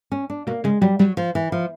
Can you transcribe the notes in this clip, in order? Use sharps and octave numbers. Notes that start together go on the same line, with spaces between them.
C#4
D4
B2 A#3
C#3 G#3
F#3 G3
F#3 G3
F3
E3
F3